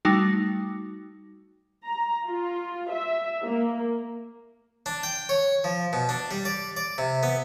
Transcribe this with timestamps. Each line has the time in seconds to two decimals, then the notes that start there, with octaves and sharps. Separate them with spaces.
0.05 G3 A3 D#4 F#4
1.84 A#5
2.27 F4
2.90 E5
3.45 A#3
4.86 D4
5.03 G5
5.29 C#5
5.64 F3
5.93 B2
6.09 D4
6.31 G3
6.45 D5
6.77 D5
6.98 C3
7.23 B3